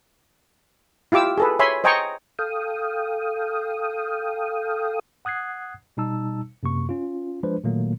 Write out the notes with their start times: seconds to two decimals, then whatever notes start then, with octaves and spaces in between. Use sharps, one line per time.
1.12 E4 F4 G4 D6 E6
1.38 G#4 A4 B4
1.59 C#5 E5 G#5 B5 C6
1.84 C5 D#5 G5 G#5 A#5 C#6
2.39 A4 F5 G5 D#6
5.25 F#5 D#6 F#6 G#6 C7
5.97 B2 G3 D#4 A5 E6
6.63 F#2 C3 A#3 C#6
6.89 C#4 F4
7.43 F3 G#3 D4 B4 C5
7.64 A#2 D#3 F#3 A3 A#3